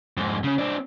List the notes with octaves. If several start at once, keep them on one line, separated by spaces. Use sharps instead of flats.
F2 G#2
C#3 C#4
C4 D4